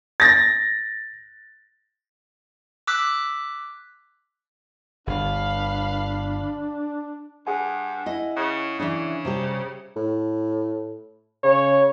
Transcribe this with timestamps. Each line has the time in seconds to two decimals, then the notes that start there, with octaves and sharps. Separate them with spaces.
0.20 A6 A#6
2.87 D6 E6 F#6 B6
5.07 G1 D4 F5 B5
7.47 G2 G#4 F#5 G#5
8.06 E4 D#5
8.36 C#3
8.79 C#3 E3 D4
9.25 C3 G3 G4
9.96 A2
11.44 C#3 C#5